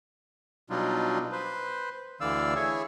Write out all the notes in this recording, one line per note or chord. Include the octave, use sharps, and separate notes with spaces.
B2 F#3 G3 D4 D#4 F4
B4 C5
D2 D3 E3 D5 F5 E6
E4 G#4 C#5